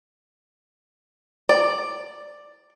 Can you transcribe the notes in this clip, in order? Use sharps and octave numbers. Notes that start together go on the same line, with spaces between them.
D5